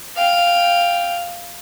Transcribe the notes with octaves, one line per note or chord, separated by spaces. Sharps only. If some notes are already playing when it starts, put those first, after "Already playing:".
F5 G5